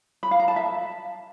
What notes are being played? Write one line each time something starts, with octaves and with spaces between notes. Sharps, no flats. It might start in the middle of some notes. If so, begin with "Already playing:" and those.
B5
F5
A#5
A5
E5